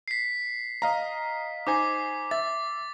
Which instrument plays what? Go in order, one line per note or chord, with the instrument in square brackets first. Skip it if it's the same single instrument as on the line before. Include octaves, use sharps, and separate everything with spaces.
[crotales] B6 C7
[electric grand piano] D#5 F5 A#5
[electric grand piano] D#4 C5 G#5 [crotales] D6
[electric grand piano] E5 [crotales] A6